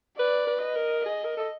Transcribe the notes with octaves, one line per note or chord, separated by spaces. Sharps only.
B4 D5
B4
D#5
A#4
G#4 D#5
A#4
A4